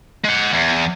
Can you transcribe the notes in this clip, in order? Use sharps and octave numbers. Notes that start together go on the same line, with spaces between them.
G#3 F#5
E2